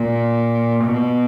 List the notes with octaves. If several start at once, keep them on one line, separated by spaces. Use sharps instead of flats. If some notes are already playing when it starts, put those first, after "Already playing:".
Already playing: A#2
B2